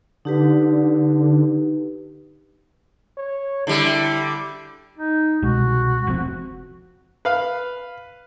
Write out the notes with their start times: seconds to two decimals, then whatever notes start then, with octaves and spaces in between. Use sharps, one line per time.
0.25 D3 D#4 G4 B4
3.17 C#5
3.67 D3 G3 E4
4.98 D#4
5.43 C2 B2 G#3 F#4
6.07 F1 F2 C4
7.25 B4 F5